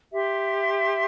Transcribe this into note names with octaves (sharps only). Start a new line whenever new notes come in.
G4 E5 C6